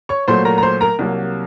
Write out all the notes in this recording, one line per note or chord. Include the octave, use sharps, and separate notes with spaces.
C#5 C#6
A#2 F#3 A3 C5 C6
A#4 A#5
A#5
C5 C6
A#4 A#5
C2 C3 F#3 A#3